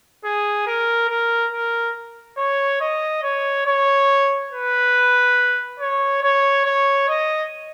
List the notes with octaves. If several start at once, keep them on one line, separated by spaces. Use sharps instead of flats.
G#4
A#4
A#4
A#4
C#5
D#5
C#5
C#5
B4
C#5
C#5
C#5
D#5